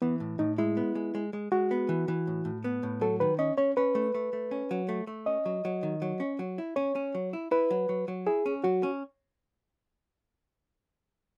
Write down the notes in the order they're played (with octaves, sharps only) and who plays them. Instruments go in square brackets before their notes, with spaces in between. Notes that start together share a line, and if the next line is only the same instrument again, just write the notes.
[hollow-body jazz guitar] E3 [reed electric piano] B3
[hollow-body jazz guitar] A2
[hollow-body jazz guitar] A2 [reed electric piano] D#4
[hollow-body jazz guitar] G#3 [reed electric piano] E4
[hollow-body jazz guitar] B3
G#3
G#3
G#3
[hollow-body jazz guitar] G#3 [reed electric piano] F#4
[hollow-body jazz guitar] B3
E3
E3
A2
A2
B3
A2
[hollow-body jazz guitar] F#3 [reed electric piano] A4
[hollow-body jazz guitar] D#3 [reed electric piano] B4
[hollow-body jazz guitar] C#4 [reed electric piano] D#5
[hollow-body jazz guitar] C#4 [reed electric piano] C#5
[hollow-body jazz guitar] C#4 [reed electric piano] B4
[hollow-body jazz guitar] A3
A3
A3
C#4
F#3
A3
A3
[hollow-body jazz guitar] C#4 [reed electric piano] D#5
[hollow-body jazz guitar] F#3
F#3
D#3
F#3
C#4
F#3
E4
[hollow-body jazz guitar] C#4 [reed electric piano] C#5
[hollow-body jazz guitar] C#4
F#3
E4
[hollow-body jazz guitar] E4 [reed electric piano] B4
[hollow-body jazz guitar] F#3
F#3
F#3
[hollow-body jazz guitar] E4 [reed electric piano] G#4
[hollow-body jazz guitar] C#4
[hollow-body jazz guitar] F#3 [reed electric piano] F#4
[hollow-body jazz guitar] C#4